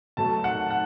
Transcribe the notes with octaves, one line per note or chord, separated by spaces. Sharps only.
B2 F#3 A3 A5
F#5
F#5